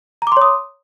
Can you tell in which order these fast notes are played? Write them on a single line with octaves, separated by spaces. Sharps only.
A#5 D6 C6 C#5 D#6